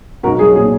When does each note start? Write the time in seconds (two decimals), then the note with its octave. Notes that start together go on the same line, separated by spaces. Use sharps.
0.23 B1 F#4 A#4
0.39 F#3 G#4
0.55 A#2 G#4